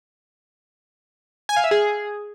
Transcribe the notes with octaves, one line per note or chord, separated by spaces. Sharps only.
G#5
F5
E5
G#4